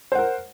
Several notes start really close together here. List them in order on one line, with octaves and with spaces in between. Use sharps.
C5 F#5 A#4